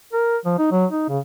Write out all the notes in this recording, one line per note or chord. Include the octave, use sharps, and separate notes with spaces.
A#4
F3
D#4
F#3
D#4
C#3